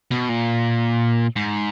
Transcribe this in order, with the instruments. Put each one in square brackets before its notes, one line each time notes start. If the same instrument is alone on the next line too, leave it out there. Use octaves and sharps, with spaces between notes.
[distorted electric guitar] B2
A#2
G#2